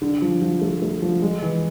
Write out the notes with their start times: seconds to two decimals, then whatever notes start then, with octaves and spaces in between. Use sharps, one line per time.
0.02 D3
0.22 F3
0.42 F3
0.61 A3
0.82 A3
1.02 F3
1.22 G#3
1.42 E3